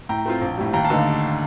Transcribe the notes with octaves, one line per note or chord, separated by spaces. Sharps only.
A2 G5 A#5
A3 C4 F4
A#1
A2 G3
D#2 G5 A#5
F5 A5
D3 A3 D#4